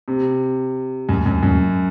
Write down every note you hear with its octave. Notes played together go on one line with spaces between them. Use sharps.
C3
F#2
F#2
F#2